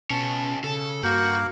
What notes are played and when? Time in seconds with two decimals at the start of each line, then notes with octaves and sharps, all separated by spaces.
0.10 C#2 B2 C#4 A5
0.64 C#3 A4
1.03 G2 A#3 F#4 A#4 G6